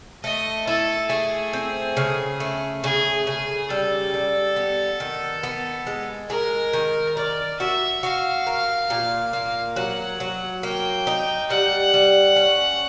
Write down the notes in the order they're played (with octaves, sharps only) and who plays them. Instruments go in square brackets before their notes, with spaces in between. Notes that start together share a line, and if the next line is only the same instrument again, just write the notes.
[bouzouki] A3 [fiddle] D#5
[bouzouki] E4 [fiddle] A4
[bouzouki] A3 [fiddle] G#4
[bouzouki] C4
C#3
A3
[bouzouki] C#3 [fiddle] G#4
[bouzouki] C#3 [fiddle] G#4
[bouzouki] G3 [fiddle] A4
[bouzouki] G3
B3
D#3
B3
G#3
[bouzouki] G#3 [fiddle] A#4
[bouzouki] D#3
[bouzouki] A#4 [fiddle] D5
[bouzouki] F#4 [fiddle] E5
[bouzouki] F#4 [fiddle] F5
[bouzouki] A#4
A#2
A#3
[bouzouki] F#3 [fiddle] F#5
[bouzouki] F#3
[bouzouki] A#3 [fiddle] G5
[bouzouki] D#4
[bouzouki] G3 [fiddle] F#5
[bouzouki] G3
C#4